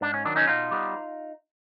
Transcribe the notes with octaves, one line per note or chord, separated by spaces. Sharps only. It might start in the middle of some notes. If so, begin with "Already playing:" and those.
G#2 D4
C#4
D#3 F#3 D4
C#4 D#4
B2 D#4 F4
G3 B3